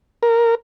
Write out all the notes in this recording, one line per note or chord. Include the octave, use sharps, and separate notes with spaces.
A#4